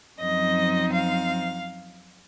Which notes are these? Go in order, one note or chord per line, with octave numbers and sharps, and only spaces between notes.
F#2 F3 C4 D#4 D#5
F5